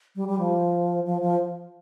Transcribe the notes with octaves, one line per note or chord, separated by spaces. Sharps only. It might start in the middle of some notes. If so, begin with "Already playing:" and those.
G3
G3
F3
F3
F3